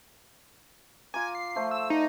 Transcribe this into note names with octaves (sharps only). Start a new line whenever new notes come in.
F4 G#5 A#5 D6
C7
F3 A3 C5
E6
D#4 D5